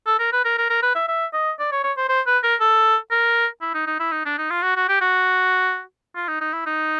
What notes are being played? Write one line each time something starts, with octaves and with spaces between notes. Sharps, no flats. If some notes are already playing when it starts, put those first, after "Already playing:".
A4
A#4
B4
A#4
A#4
A#4
B4
E5
E5
D#5
D5
C#5
C#5
C5
C5
B4
A#4
A4
A#4
E4
D#4
D#4
E4
D#4
D4
D#4
F4
F#4
F#4
G4
F#4
F4
D#4
D#4
E4
D#4